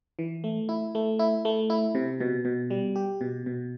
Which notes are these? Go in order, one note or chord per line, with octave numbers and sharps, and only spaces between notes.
E3
A3
E4
A3
E4
A3
E4
C3
B2
B2
G3
G4
B2
B2